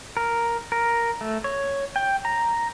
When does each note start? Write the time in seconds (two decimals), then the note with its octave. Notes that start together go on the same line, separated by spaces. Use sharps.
0.17 A#4
0.72 A#4
1.21 A3
1.44 C#5
1.96 G5
2.25 A#5